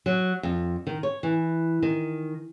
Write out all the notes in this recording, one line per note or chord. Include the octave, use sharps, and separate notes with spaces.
F#3
F2
D#3
C#5
E3
D#3